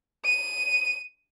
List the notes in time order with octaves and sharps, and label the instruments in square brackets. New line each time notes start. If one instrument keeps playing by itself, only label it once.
[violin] D#7